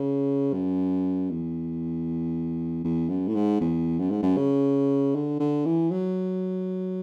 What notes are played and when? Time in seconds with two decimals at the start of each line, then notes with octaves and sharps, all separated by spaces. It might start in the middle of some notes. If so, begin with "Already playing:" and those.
Already playing: C#3
0.53 F#2
1.30 E2
2.84 E2
3.09 F#2
3.28 A2
3.35 G#2
3.61 E2
3.99 F#2
4.11 G#2
4.23 F#2
4.37 C#3
5.15 D3
5.40 D3
5.66 E3
5.91 F#3